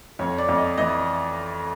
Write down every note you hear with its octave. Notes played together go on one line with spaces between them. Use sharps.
F2 C#5
D5
F2
D#5
E3 D#5